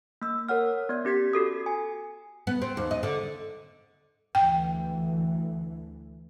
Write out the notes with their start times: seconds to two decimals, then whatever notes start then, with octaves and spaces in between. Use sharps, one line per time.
0.22 A#3 E6
0.49 A#4 C#5 F#5 F6
0.89 B3 D5 G#6
1.05 C#4 G4 G#6 B6
1.33 F#4 A4 D#6
1.66 G#5
2.47 B3
2.62 C4
2.77 D#2
2.91 D#5
3.03 D3
4.35 D2 E3 G5